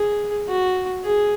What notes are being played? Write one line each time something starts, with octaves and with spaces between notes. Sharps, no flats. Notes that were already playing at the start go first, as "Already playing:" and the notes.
Already playing: G#4
F#4
G#4